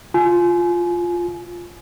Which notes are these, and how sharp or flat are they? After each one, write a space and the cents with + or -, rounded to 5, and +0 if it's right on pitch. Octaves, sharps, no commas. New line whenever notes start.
F4 +0 G#5 +30